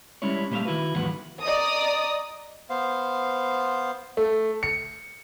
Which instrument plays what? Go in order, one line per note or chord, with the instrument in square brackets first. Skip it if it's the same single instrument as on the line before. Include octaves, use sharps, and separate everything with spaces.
[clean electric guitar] G3 G#3 C#4 E4 C#5
A#2 G3 A3 C5 E5 F5
D#3 E4 F#4 B4
D#2 G#2 E3 F#3 B4 F#5
[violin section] D5 D#5 A#5 D#6
[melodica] B3 C5 F5
[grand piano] A3
C#7